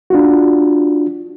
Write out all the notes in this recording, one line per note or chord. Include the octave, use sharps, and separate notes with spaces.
D4 F4 F#4